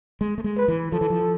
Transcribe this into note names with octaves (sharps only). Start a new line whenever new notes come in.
G#3
A3
G#3
B4
E3
F3 A4
E3
F3